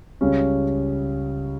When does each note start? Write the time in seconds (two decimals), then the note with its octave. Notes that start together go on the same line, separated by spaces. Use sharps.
0.21 C#2 C#3 G3 C#4